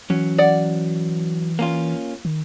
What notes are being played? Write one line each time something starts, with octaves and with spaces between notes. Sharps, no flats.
E3 F#3 C#4
D5 F#5
A#3 C#4 F4
D#3